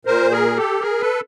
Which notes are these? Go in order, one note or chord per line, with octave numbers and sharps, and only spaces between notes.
A#2 A#4 C5
G#4 A#4
G4 A4
G#4 A#4
A4 B4